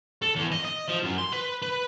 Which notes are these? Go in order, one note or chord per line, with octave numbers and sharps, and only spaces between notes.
A4
E2
D#5
D#5
F3
F#2
C6
B4
B4